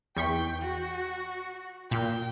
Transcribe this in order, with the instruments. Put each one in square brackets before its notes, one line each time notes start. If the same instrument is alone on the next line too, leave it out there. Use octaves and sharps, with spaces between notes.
[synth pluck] E2 C#6 B6 [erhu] G5
[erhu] F#4
[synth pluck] A#2 [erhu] G5